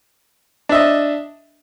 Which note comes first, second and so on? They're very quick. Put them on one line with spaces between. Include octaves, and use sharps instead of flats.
D4 E5 D#5